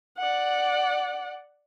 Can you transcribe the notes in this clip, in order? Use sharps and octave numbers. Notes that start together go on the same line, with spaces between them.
D5 F#5